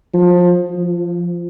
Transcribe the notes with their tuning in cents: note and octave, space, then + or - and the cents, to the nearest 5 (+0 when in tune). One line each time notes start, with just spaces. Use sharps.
F3 +25
F3 -15